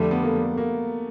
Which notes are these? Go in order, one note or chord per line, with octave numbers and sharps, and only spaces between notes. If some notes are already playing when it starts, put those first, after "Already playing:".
Already playing: F2 D3 G3 A3
B3
A#3
A#3